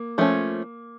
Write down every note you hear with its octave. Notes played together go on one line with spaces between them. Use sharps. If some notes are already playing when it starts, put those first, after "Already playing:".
Already playing: A#3
F3 A3 C#4